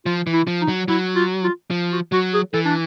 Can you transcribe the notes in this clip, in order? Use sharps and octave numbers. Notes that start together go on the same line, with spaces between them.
F3 F4
E3
E4
F3
D#4
F#3
F#3 E4
F4
F4
F3
F#4
F#3 F#4
G#4
E3 A4
D4